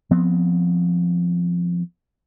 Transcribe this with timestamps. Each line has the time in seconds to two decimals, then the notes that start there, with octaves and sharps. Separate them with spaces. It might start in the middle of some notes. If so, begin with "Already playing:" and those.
0.11 F3 B3 C4